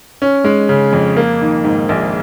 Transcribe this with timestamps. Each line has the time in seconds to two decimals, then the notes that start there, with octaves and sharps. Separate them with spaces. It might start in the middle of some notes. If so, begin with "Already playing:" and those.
0.22 C#4
0.44 G#3
0.69 C#3
0.93 F2
1.17 A#3
1.41 D#3
1.64 G#2
1.89 A#1